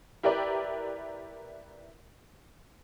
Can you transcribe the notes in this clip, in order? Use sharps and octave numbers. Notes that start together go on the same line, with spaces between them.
E4 G4 A#4 B4 D5